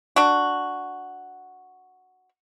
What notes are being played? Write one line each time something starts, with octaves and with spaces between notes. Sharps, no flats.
D4 F#4